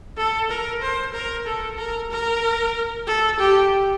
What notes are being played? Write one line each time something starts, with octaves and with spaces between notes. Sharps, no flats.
A4
A#4
C5
A#4
A4
A#4
A#4
A4
G4